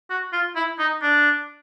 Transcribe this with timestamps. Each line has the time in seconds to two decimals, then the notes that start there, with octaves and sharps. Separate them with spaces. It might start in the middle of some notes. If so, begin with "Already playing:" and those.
0.10 F#4
0.33 F4
0.56 E4
0.79 D#4
1.02 D4